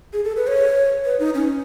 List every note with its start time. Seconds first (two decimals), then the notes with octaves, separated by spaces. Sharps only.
0.13 G#4
0.25 A4
0.37 B4
0.47 C#5
1.05 B4
1.20 D#4
1.34 C#4